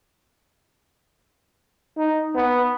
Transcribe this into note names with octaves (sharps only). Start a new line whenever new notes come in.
D#4
B3